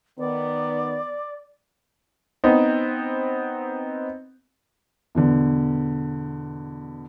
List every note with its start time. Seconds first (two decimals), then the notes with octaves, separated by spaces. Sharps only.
0.19 D#3 B3 D5
2.44 B3 C4 D#4
5.15 E2 B2 D3